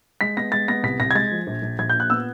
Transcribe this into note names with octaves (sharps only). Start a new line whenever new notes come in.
G#3 B6
B3 A#6
G#3 A6
B3 A#6
C2 B6
C2 A#6
G#6
G#3 A6
F3
A#1
A#1
A#1 G#6
G6
A#2
F#6
B3 E6